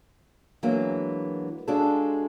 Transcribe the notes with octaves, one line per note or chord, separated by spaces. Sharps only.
E3 F#3 G#3 A#3 B3 D4
G#3 D4 F4 F#4 G#4 A4